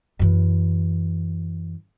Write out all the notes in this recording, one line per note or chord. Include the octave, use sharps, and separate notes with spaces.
F#2 E3